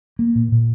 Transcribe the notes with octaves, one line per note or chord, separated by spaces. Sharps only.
A#3
A#2
A#2